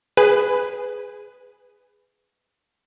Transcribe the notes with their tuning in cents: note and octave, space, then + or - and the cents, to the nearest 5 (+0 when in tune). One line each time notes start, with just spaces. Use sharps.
G#4 +0 B4 +15 G#5 +0